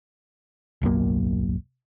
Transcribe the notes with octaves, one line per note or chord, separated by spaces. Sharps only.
D1 B1 F#2 A#3